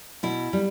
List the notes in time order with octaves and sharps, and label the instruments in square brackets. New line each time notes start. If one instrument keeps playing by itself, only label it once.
[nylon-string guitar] B2 E4
G3